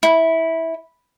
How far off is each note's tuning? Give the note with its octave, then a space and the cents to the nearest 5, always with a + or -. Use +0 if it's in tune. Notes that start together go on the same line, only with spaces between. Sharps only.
E4 -15